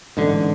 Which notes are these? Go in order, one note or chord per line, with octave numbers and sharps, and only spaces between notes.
A1 G#2 D3